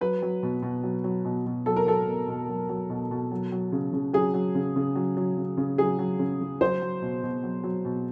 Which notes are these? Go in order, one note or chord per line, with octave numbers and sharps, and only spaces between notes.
F#3 B4
F#3
B2
B2
F#3
F#3
B2
B2
F#3 A4
A#4
F#3 A4
B2
B2
F#3
F#3
B2
B2
F#3
F#3
C#3
C#3
F#3 G#4
F#3
C#3
C#3
F#3
F#3
C#3
C#3
F#3 G#4
F#3
C#3
C#3
F#3 C5
F#3
B2
B2
F#3
F#3
B2